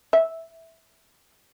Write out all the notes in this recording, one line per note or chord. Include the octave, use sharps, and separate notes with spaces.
E5